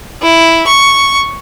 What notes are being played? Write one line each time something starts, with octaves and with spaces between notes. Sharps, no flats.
E4
C#6